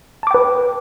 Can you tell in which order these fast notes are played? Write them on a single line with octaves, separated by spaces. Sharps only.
A5 D6 G5 B4